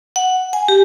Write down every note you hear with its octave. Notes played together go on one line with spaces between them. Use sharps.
F#5
G#5
G4